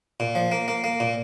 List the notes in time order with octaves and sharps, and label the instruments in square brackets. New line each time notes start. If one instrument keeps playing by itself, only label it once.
[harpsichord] A#2
F3
A#3
A#3
A#3
A#2